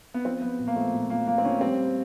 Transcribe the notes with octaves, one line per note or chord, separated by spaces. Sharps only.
B3
F3 C4
F3 B3
A#2
A#3
F3 A3
A#2
F3 A#3
F3 A#3
C4
F3 C#4
G3 C4